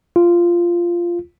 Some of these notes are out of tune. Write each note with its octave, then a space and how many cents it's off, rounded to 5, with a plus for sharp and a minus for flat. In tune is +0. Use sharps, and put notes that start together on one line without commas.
F4 -10